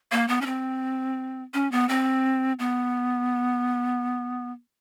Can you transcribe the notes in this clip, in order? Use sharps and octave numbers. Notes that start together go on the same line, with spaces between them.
A#3
B3
C#4
C4
C#4
B3
C4
B3